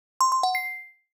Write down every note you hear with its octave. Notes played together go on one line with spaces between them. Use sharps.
C6
C6
F#5
C7